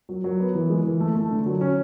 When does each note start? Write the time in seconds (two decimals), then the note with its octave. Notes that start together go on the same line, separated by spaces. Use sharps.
0.09 F#3
0.24 F#3
0.40 B3
0.55 E3
0.70 G#3
0.85 E3
1.00 A3
1.15 A3
1.30 D3
1.46 F#3
1.61 C#4